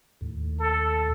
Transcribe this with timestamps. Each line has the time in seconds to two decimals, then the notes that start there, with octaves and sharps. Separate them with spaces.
0.21 D#2 A2
0.60 A4